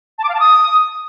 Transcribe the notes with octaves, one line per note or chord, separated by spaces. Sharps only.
A5
D6
F5
A5
D#6